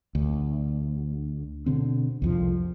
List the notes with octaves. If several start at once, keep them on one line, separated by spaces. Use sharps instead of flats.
D2
B2 D3 C4
C2 F2 F3